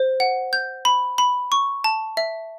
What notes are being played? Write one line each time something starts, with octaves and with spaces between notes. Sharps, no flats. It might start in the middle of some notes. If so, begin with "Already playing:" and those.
Already playing: C5
F#5
G6
B5
B5
C#6
A5
E5